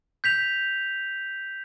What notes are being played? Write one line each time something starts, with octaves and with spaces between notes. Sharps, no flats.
G6 B6 F7